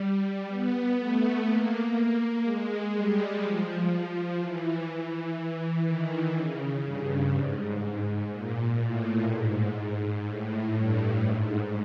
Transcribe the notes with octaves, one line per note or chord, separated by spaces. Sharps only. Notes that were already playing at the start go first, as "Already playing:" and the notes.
Already playing: G3
B3
A3
A#3
G#3
G3
F3
F3
E3
E3
E3
D#3
C#3
G2
G#2
A#2
A2
G#2
G#2
A2
G2
G#2